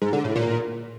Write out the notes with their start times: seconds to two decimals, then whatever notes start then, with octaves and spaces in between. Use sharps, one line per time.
0.02 G#2
0.13 D3
0.24 A2
0.36 A#2